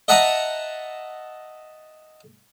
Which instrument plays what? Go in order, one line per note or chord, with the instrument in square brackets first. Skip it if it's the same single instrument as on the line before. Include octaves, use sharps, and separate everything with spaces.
[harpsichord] D#5 E5 F#5 A5 A#5 D#6